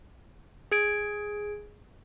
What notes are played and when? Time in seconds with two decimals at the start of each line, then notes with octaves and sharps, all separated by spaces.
0.72 G#4 G#6 D7